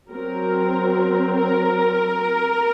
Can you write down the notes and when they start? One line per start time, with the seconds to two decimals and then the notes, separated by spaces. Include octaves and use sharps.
0.10 F#3 C4 A#4
1.36 A#4